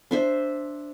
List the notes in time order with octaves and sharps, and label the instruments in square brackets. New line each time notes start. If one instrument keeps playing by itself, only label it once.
[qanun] D4 C5 E5